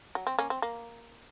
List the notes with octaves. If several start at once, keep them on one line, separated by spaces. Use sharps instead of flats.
F#3
C4
A#3 C#4
C4
A#3